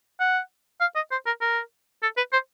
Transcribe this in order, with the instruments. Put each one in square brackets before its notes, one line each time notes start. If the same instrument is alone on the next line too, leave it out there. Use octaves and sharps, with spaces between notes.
[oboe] F#5
F5
D#5
C5
A#4
A#4
A4
B4
C5